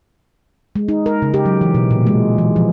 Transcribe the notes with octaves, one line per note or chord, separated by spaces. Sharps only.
G#3
D#4
A#4
C#3
G4
F#3
E3
B2
A#2
G#3
E3
F3